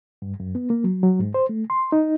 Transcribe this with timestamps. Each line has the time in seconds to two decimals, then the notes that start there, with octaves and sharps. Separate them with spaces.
0.22 G2
0.40 F#2
0.55 B3
0.70 A#3
0.84 F#3
1.03 F#3
1.19 G#2
1.34 C5
1.49 A3
1.70 C6
1.92 D#4